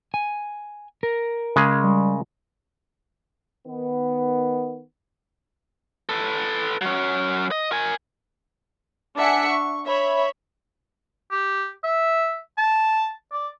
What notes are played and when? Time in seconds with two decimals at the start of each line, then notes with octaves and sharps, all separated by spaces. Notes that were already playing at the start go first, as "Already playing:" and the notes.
0.14 G#5
1.03 A#4
1.56 C#3 G#3 G#4
1.84 G3
3.67 D#3 B3
6.09 A4 B4
6.82 F#3 C#4
7.51 D#5
7.72 A#4 G#5
9.17 D4 E5 F#5 G#5 B6 C#7
9.47 C#6
9.85 C#5 E5 B5
11.31 G4
11.84 E5
12.58 A5
13.32 D5